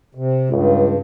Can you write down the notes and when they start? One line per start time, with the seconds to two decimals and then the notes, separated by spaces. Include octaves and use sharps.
0.15 C3
0.50 C#2 G2